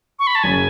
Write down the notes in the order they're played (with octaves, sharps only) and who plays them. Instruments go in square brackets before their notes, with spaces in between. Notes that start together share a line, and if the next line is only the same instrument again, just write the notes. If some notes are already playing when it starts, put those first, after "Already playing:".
[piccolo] C#6
B5
A5
[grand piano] F#1 F#2 C#3 [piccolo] G#5